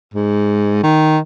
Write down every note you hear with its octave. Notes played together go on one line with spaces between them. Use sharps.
G#2
D#3